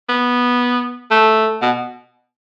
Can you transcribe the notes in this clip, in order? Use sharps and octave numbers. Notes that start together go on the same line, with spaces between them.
B3
A3
B2